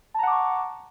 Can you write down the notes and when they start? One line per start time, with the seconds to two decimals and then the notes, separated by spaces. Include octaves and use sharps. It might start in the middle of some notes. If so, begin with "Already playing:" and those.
0.14 A5
0.19 A#5
0.23 F#5
0.27 D6
0.32 C#6